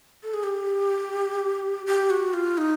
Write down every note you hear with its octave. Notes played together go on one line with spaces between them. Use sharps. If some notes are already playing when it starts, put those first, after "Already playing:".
A4
G#4
G4
G4
F#4
F4
D#4